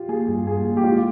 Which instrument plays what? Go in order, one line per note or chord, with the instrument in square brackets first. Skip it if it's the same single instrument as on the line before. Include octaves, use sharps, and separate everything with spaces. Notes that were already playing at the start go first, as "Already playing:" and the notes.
Already playing: [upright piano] F4 G4
[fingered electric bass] A#3 [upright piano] G#4
[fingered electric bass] G2
[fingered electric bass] A#3 [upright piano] G#4
[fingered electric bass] A#3
[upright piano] G4
[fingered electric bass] G#3 [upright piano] F4